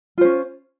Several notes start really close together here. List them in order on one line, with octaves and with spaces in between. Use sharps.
F4 C5 C#4